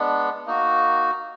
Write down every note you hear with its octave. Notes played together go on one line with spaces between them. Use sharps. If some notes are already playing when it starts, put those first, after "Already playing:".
Already playing: G#3 B3 D4
A#3 D#4 F#4